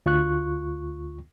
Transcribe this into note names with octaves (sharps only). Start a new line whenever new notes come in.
D2 F4 C#6 F#6